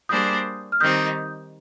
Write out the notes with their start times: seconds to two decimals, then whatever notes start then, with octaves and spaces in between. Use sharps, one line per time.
0.09 G3 A#3 D4 G#4 C5 D#6 G6
0.72 F6
0.80 D#3 G3 C4 D#4 D#6 G6